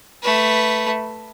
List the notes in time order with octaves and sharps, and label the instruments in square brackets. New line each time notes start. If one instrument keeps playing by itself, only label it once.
[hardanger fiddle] A3 B4